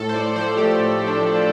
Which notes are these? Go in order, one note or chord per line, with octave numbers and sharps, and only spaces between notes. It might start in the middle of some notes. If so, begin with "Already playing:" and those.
Already playing: A2 A4
C5
A2 D5
F3 C5
A3 G4
A2
A2
D4
F3
F4